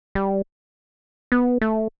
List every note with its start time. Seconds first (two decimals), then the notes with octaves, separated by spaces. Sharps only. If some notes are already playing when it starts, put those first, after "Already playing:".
0.15 G3
1.32 B3
1.61 A3